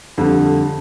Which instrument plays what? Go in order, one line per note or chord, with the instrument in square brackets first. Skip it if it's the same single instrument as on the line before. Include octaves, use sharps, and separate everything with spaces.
[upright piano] F2 D3 G3